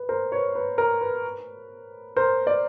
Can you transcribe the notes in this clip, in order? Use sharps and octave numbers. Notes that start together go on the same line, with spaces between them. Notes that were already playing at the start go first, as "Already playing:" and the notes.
Already playing: B4
A#4 C5
B4 C#5
B4
A#4
B4
A#4 C5
C5 D5